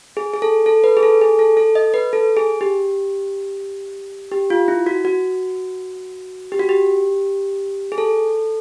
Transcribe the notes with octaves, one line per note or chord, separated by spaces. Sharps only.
G#4
G#4
A4
A4
B4
G#4
A4
G#4
A4
A4
D#5
B4
A4
G#4
G4
G4
F4
E4
F#4
F#4
G4
F#4
G4
G#4
A4